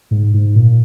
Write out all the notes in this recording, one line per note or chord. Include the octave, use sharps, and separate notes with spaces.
G#2
G#2
A#2